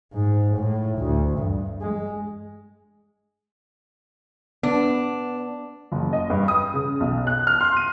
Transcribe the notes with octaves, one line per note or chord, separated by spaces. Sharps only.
G#2
A2
D2
G2
G#3
B3 D4
F#1
D#5
G2
D#6
C#3
B1
F#6
F6
C6
D#7